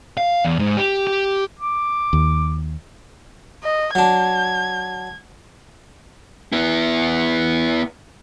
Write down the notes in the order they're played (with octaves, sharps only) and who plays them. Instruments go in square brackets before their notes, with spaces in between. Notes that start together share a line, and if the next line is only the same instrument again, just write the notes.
[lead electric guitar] F5
E2
G#2
G4
G4
[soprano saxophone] D6
[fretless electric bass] D#2
[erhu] D#5
[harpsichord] F#3 D4 [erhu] G#6
[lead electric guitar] B3 E4